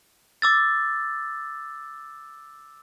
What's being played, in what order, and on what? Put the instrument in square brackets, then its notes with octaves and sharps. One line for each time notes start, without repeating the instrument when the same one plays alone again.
[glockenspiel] D6 E6 A6